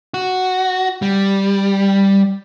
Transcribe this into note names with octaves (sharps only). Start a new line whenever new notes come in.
F#4
G3